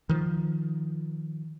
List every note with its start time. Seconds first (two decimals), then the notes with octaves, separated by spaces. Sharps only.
0.09 D#3 F3